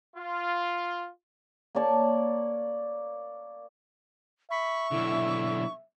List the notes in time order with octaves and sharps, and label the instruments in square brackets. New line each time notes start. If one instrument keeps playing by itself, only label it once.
[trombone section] F4
[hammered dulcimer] A#3 C#5 D5 A5
[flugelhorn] E5 [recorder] B5 [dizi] C#6
[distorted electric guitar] B1 D3 [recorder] E4